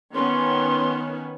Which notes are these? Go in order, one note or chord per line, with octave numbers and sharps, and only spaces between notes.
D#3 B3 C#4 C6